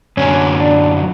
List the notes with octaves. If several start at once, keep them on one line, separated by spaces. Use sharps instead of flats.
F#2 D3 F#3 C#4
D4